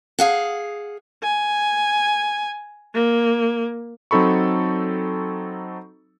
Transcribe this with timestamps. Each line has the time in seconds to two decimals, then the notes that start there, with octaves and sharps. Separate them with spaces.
0.19 G#4 F5 F#5
1.23 G#5
2.95 A#3
4.11 F#3 C4 D#4 A4 B5 C#6